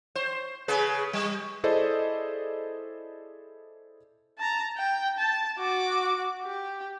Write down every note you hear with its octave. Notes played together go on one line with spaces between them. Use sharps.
C5
C#3 G#4 B4
G3
E4 G#4 A4 C5 D5 D#5
A5 A#5
G5
A5
F#4 D6
G4